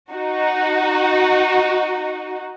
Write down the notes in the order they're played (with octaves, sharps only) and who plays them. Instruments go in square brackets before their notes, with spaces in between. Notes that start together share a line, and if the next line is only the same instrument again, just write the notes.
[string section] D#4 F#4